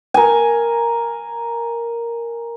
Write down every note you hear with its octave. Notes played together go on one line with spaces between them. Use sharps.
A#4 G#5